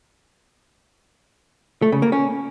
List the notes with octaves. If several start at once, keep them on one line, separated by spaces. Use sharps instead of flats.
A3
C#3
A#3
C#4